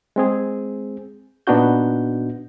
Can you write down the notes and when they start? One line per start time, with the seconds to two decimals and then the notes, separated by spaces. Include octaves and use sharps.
0.16 G#3 C4 G#4
1.47 A#2 B3 D4 D#4 F#4 G6